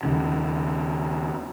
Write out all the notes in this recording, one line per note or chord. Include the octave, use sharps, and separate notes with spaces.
D#2 C#3